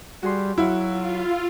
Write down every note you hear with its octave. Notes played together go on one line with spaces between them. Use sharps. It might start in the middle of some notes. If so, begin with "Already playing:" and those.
G3 F#4 G#4 C6
F#3 E4 F5 F#5
F4